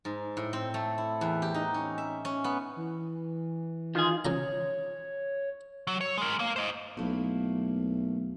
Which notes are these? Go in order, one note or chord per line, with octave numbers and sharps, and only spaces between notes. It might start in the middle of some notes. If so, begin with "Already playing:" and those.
G#2
A2
C4
A3
E4
E2
G4
D#4
C#4
E5
C#4
B3
E3
D#3 F4 G#4
C#3 F3 C#5 A#5
F#3
C#5
G#3 A#4
A#3 F5
C5 D#5
B1 A3 A#3 E4